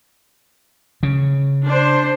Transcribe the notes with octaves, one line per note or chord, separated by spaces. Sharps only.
C#3
D4 C5